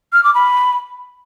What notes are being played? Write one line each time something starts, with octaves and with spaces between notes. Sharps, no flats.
F6
D6
B5